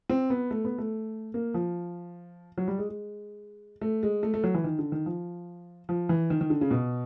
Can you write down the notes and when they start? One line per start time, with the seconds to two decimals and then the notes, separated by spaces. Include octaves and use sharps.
0.09 C4
0.30 B3
0.51 A3
0.65 B3
0.78 A3
1.34 A#3
1.54 F3
2.58 F#3
2.68 G3
2.78 G#3
2.89 G#3
3.81 A3
4.03 G#3
4.23 A3
4.34 A3
4.44 F#3
4.54 E3
4.64 D#3
4.79 D3
4.92 D#3
5.06 F3
5.89 F3
6.09 E3
6.30 D#3
6.41 D#3
6.50 D3
6.61 C#3
6.71 B2